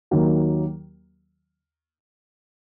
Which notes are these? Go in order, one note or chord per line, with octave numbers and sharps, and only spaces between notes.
D#2 D#3 F#3 A#3